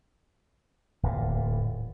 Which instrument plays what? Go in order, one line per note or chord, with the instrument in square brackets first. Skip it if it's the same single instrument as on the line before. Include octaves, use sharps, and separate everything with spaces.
[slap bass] D1 E2 A#2